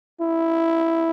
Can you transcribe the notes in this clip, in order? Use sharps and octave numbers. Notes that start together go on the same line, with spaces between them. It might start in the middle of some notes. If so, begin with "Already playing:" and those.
E4